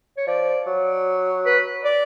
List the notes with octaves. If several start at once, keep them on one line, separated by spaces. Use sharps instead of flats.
C#5
F3 D5
F#3
B4
D5